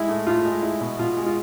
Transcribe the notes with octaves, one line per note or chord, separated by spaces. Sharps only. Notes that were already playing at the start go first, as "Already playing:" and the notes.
Already playing: G#3 E4
A2
A2 F4
G#3
G#3 E4
B2
B2 F4
G#3
F4